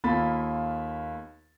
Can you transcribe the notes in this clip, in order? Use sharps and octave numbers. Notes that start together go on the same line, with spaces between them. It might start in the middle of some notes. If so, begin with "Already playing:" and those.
D#2 A#3 F4 A4 B5 A6